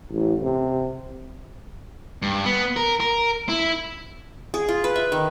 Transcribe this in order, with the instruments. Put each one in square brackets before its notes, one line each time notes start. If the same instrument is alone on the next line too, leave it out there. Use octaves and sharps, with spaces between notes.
[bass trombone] A1
C3
[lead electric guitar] G2
B3
A#4
A#4
E4
[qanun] G#4
F4
B4
E5
D#3